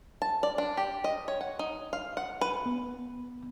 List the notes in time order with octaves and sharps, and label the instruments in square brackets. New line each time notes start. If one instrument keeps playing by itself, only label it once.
[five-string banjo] A5
D5
D4
G4
D#5
C#5
F#5
D#4
F5
F#5
B4
[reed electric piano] B3